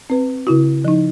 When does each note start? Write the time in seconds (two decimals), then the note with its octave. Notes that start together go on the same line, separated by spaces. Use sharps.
0.10 C4 B4
0.47 C#3 E4 F#4
0.85 F3 D#4